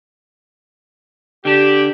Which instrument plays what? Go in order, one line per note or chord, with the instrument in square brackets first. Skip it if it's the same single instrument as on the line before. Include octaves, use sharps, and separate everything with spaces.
[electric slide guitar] D3 D4 [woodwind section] G4